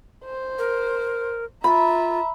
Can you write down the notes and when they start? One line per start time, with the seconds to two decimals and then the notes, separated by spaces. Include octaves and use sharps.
0.25 C5
0.58 A#4
1.64 F4 E5 A#5 B5